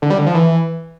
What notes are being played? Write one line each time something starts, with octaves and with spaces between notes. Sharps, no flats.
D3
G3
D3
F3
E3